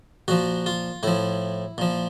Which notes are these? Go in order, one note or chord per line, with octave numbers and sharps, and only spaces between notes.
A#2 F3 F#4
F4
A2 F3 E4
A#2 F3